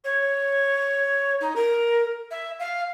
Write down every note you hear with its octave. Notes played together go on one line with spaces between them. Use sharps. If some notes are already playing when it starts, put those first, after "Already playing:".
C#5
D#4
A#4
E5
F5